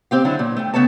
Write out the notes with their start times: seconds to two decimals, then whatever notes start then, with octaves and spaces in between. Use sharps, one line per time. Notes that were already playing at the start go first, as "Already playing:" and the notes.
0.11 A#2 C4 G4 F5
0.25 D3 F#3 C#4 D4 E4
0.39 A#2
0.57 A3 G5
0.74 C#3 B3 A4 C#5 A5